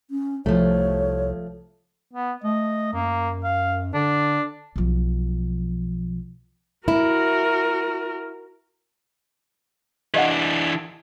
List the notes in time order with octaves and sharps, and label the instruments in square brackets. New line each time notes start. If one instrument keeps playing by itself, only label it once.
[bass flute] C#4
[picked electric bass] C2 [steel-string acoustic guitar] F3 A3 [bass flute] C#5
[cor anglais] B3
[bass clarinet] A3 [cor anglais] D#5
[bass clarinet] F#2 [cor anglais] A#3
[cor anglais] F5
[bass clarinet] D3 [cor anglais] D4
[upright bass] B1 F3
[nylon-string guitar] E4 [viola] F#4 A#4
[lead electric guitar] E3 D4 [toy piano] G4 D#5 F#5